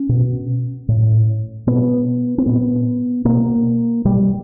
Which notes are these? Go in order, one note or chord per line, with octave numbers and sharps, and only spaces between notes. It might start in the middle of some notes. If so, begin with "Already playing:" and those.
Already playing: C#4
B2
A2
B2 B3
C4
A#2 B3
B2 A#3
B2 G3